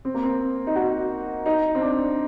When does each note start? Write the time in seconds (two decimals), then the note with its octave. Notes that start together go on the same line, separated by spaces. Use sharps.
0.05 C4
0.14 A#3
0.24 C4
0.67 D#4
0.76 F#4
1.46 D#4
1.75 C4
1.81 D4